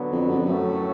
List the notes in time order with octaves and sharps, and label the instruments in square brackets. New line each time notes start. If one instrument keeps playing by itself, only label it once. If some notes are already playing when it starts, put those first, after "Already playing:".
Already playing: [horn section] D3 F#3 B3
[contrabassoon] F2
F#2
F2
[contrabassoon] F#2 [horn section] A2 F#3 A3